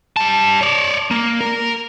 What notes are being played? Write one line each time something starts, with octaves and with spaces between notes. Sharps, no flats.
G3 A5
C#5 D5
A#3
A#4